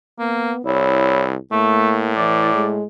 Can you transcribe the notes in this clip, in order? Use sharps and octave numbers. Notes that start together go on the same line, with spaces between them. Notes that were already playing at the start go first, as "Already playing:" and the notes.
A#3 B3
C2 E4 C#5
A2 A3 A#3
E3 D5
G#3